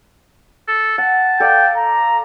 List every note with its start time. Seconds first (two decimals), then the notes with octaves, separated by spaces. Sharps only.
0.68 A4
0.98 F#5 A5
1.40 A4 D5 F5 G5
1.77 A#5